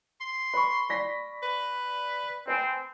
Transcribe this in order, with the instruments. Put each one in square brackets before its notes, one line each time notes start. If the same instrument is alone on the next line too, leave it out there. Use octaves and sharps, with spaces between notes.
[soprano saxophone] C6
[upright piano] B4 [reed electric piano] B5 C#6
[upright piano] D5 A#6 B6
[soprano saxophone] B4
[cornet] C4 [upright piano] B4 G#5